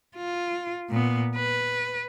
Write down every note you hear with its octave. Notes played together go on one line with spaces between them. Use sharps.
F4
A#2 B3
B4